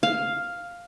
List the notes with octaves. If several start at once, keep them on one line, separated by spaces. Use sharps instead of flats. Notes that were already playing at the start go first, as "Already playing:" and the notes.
F5